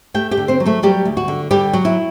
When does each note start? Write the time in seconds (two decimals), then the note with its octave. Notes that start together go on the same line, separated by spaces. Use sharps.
0.14 A3 G4 G5
0.31 G4 G5
0.37 D3
0.48 C4 C5
0.60 F#3
0.66 A3 A4
0.83 F#3 G3 G4
1.05 D2
1.17 F#4
1.28 D3
1.51 D3 G3 G4
1.73 F#3
1.85 E4